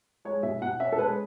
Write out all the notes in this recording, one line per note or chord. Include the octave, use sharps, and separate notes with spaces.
G#3 C#5
B2 E5
B2 F#5
C#4 E5
A4
G#3 B4